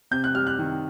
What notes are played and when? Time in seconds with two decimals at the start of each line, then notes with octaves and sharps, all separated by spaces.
0.11 C3 G6
0.24 F#6
0.35 G3 F6
0.47 F#6
0.59 D#3